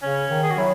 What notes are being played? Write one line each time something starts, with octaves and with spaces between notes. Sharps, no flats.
C#3 C#4
D#3
G#4
F#4
F#3 E4